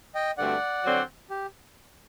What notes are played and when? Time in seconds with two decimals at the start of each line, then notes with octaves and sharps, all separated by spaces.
0.15 D#5 G5
0.38 G2 D3 A3 C4 F#4 D5 F#5
0.84 D3 F#3 C4 F#4
1.30 G4